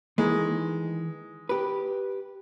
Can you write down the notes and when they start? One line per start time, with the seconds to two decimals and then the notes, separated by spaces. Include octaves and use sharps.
0.18 D#3 E3 G#3
1.49 G4 B4